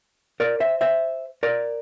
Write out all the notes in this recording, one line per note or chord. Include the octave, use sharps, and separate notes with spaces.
A#4 D5
C5 E5
C5 E5
A#4 D5